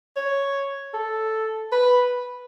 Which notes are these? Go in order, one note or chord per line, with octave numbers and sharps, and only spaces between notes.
C#5
A4
B4